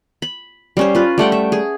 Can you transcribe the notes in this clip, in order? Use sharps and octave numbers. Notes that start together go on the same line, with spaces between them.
B5
G3 C#4 C5
F4 B4
G3 A3 F#5 G5
E5
G#4